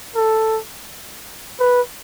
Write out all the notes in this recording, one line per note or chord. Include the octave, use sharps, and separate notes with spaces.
A4
B4